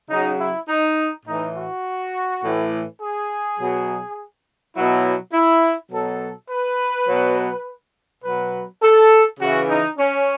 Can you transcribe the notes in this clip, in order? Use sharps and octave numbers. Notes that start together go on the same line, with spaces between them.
C#3 F#3 D#4
E4
D#4
A2 E3 D#4
F#4
A2 E3
G#4
B2 F#3
B2 F#3 E4
E4
B2 F#3 A4
B4
B2 F#3
B2 F#3 B4
A4
C#3 E3 F#4
D#4
C#4